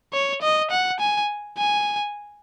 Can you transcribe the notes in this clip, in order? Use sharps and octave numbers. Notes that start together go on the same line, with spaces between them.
C#5
D#5
F#5
G#5
G#5